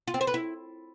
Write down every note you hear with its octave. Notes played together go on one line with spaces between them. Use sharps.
F4
C4
C5
B4
E4